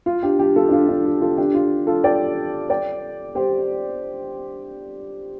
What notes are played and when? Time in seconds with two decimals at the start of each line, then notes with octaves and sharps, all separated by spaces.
0.06 F4
0.23 D4 G4
0.39 D4 G4
0.56 F4 A4
0.69 D4
0.72 F4
0.88 D4
1.05 F4
1.21 F4 A4
1.38 D4 G4
1.54 F4
1.87 F4 A4
2.04 D5 G5
2.70 D5 G5
3.35 G4 C5